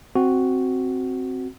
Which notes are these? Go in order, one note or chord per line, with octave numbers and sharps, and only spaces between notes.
C4 F#4